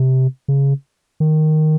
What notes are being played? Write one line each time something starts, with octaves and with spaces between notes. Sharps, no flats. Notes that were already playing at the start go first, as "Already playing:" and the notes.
Already playing: C3
C#3
D#3